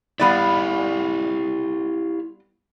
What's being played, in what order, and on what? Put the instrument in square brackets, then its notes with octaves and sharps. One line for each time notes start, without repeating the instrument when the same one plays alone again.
[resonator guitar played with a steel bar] G3 B3 D5 [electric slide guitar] E4 G4 F5